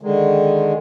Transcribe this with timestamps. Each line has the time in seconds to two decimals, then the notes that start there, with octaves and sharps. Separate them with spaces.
0.01 D3 D#3 G#3